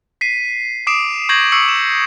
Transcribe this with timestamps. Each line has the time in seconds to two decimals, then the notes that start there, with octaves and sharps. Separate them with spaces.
0.21 B6 C7 D#7
0.87 D6 D#6 C7 D7 E7
1.29 C#6 G6 G#6 A#6 C7 F#7
1.52 C#6 D#6 E6 C7 C#7 F#7
1.69 E7